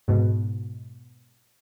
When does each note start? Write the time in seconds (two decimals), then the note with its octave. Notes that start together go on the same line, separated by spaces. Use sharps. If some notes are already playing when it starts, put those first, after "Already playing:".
0.08 G#2 B2